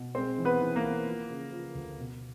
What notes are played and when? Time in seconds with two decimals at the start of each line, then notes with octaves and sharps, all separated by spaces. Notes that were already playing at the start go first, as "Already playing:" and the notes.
Already playing: B2
0.15 G#3 C4 C5
0.38 E3
0.45 B3 B4
0.61 E3
0.76 A#3 A#4
0.84 B3
1.06 F3
1.30 C#3
1.52 F3
1.75 D2
1.98 B2